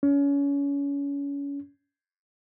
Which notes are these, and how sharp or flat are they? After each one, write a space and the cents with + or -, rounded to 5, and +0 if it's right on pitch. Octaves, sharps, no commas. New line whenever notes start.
C#4 +30